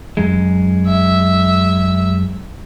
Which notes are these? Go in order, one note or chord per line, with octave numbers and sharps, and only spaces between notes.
F#2 G#3
E5